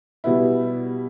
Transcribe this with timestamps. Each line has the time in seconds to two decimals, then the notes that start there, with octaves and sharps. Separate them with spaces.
0.24 B2 G3 B3 E4